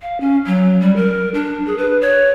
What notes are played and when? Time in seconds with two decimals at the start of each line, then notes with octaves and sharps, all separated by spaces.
0.02 F5
0.21 C#4
0.46 F#3
0.80 G3
0.96 A#4
1.34 D4
1.66 G#4
1.78 B4
2.01 C#5